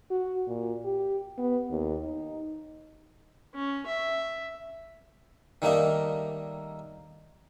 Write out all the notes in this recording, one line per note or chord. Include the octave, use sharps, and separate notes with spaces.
F#4
A#2
G4
B3
D#2
D#4
C#4
E5
D#3 G3 A3 A#3 D#4